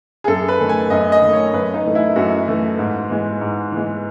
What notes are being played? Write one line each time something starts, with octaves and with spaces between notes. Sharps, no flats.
G#4
F#2 A4
B4
D#3 A3
G#5
F#2 D#5
D#5
D#3
A3
C#5
F#2 B4
D#4
E3 A3
E4
F#2 F#4
E3 A3
G#2
E3 G#3
G#2
E3 G#3